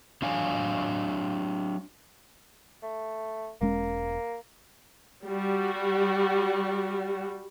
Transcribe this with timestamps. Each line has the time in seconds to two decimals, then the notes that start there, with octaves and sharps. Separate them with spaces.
0.22 F#3 D4 F5 G#5
2.83 A3
3.61 E1 G#3 A#3 C#4
5.26 G3 F#4